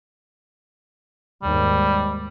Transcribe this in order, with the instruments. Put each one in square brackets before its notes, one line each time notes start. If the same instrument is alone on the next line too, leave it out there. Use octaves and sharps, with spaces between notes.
[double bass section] D#2 G#2 [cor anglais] G3